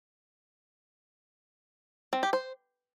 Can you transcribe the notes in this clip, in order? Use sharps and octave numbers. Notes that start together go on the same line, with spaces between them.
C4
G4
C5